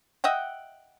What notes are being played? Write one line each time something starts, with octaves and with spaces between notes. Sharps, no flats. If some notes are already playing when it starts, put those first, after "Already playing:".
D#5 E5 F#5 G5